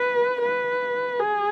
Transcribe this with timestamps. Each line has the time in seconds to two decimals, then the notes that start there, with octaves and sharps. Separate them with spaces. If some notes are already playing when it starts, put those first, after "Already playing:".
Already playing: B4
0.41 B4
1.19 G#4